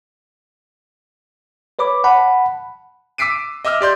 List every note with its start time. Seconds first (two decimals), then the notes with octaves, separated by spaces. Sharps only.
1.79 B4 C#5 B5 D6
2.04 F#5 A5 B5
3.18 D6 E6 B6 C7 D7 D#7
3.65 D#5 E5 D6 E6 F6
3.81 G4 D5 C6 G6